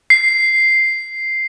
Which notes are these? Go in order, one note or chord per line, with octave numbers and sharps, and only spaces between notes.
C7